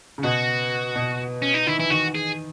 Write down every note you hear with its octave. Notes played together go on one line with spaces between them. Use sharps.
C#3
B2 F#4
B2
C#4
D#4
D#3 E4
E3 E4
D#3 F#4
G#4